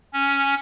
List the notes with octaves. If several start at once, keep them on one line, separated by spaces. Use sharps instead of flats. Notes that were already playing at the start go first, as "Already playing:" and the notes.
C#4